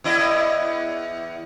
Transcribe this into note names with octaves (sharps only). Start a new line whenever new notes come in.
E2 E4 D#5